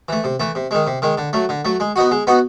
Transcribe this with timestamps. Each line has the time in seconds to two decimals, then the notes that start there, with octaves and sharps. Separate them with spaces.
0.09 E3 A3
0.24 C3
0.40 E3 A3
0.55 C3
0.71 D#3 G#3
0.87 C3
1.02 D#3 G#3
1.18 D3
1.33 F#3 A3
1.49 D3
1.65 F#3 A3
1.80 G#3
1.96 B3 D#4 F#4
2.11 G#3
2.27 B3 D#4 F#4